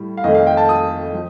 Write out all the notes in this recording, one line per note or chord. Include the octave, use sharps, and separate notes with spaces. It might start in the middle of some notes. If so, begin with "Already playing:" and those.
Already playing: A2 G3
F5
F2 D#3 A3 D#5
F5
G5
A5
D#6
F3